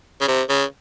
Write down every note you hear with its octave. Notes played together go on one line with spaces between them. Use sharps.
C#3
C3
C#3